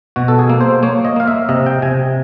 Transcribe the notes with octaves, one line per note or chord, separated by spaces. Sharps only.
B2 F#4
A4
G#4
A#3
C5
A#3 C#5
D#5
A#3 F5
E5
C3 D#5
G5
C3 G#5